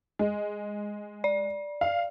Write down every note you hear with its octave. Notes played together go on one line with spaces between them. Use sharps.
G#3
D5
F5